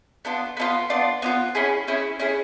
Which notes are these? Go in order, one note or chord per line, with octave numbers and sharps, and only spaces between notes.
B3 D4 F4
B3 D4 F4
B3 D4 F4
B3 D4 F4
C#4 E4 G#4
C#4 E4 G#4
C#4 E4 G#4